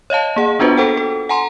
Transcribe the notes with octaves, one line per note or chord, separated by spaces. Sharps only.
C#5 D#5 F5 A5
A#3 G#4 F#5
B3 D4 F4 F#4 B4 C5
A4 C5 F#5 G5
A4
F#5 G#5 A#5 C6